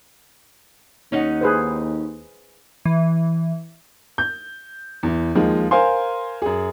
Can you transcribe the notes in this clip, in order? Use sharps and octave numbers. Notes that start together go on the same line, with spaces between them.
D#2 C#4 D#4 F#5
G#4 B4 C5
E3
G6
E2 E3
D#2 F3 G#3
A#4 C5 F5 G#5 C6
F#2 G#4